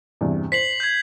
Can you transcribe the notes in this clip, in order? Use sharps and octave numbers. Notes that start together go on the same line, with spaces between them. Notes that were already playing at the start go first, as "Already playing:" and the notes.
E2 G2 C3
C5 B6 C7 F#7
G6 G#6